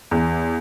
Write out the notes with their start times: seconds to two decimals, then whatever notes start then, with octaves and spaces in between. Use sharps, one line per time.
0.11 E2